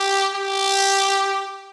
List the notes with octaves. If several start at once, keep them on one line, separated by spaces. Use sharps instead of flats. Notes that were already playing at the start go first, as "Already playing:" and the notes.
Already playing: G4
G4